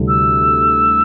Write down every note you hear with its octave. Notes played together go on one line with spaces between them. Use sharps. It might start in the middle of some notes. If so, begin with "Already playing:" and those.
Already playing: D2 C3 G3 C4 E4
E6